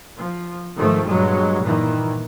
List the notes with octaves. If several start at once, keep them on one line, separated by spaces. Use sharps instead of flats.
F3
G#2 D#3 F3 A3
G2 A#2 F#3 G#3
A#2 D#3 E3